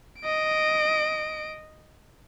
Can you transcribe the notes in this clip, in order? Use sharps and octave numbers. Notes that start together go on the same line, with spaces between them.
D#5 D7